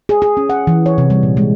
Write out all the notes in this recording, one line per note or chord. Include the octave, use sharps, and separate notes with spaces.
G#4
G#4
C#4
F#5
E3
C#5
C3
G3
A#2
G#3